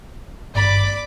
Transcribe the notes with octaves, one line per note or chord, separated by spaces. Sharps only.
G#1 G2 A#3 D5 B5 D6